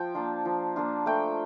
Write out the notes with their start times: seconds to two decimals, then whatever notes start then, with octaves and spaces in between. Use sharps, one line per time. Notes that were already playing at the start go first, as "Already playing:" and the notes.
Already playing: F3 G5
0.15 A#3 D4 F4
0.45 F3
0.76 A#3 D4 F4
1.06 A3 G5